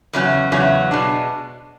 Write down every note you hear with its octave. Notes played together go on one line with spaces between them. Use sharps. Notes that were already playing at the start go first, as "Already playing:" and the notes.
E2 C#3 F#3 C#4
E2 C#3 F#3 C#4
B2 G#3 D4